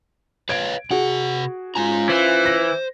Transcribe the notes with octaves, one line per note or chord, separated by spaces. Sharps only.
B4 C#5 F5 G#6 D7
C3 F#4 G#4 F#5
G#3 C#4 F4 G#5 A#5
E3 C5
A#6